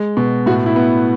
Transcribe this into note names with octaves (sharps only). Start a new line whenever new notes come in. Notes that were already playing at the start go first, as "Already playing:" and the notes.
Already playing: G#3
B2
A2 F#4
E4
B3